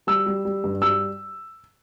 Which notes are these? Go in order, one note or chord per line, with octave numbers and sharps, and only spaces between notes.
G3 E6
G3
G3
G2
G3 E6